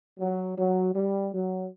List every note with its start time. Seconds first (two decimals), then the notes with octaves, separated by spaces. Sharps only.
0.19 F#3
0.57 F#3
0.94 G3
1.33 F#3